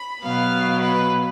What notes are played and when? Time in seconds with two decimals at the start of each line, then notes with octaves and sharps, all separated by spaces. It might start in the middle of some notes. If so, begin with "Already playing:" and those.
Already playing: B5
0.23 B2 F#3 B3 F5
0.82 B4